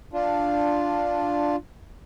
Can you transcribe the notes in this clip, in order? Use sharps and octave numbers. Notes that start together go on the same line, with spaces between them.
D4 F4